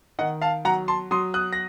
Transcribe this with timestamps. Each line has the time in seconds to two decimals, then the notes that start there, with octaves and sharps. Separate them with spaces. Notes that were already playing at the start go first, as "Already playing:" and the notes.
0.19 D#3 D#5 F#5
0.41 F5 A5
0.65 F#3 F#5 A#5
0.88 A5 C6
1.11 F#3 C6 D#6
1.34 D#6 F#6
1.53 A#6